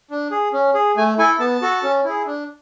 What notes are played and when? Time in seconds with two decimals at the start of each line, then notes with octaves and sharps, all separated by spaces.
0.10 D4
0.31 G#4
0.53 C#4
0.74 G#4
0.96 A3 G#5
1.18 E4 A4 G#5
1.40 B3 A5
1.62 F#4 A4
1.83 C#4
2.04 E4 G#4
2.26 D4